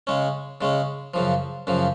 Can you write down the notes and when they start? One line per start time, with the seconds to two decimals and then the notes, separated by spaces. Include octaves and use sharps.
0.07 C#3 G#3 C#4
0.61 C#3 G#3 C#4
1.14 F#2 C#3 F3
1.67 F#2 C#3 F3